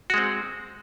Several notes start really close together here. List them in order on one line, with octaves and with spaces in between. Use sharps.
F#4 G#3 C4